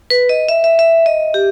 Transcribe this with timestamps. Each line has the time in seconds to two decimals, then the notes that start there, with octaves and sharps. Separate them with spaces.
0.10 B4
0.29 D#5
0.49 E5
0.64 E5
0.79 E5
1.06 D#5
1.34 G4